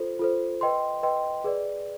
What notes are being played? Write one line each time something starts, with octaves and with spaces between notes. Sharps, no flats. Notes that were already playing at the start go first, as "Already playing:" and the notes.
Already playing: F4 A4 C5
F4 A4 C5
B4 D#5 G5 C6
B4 D#5 G5 C6
G#4 B4 D5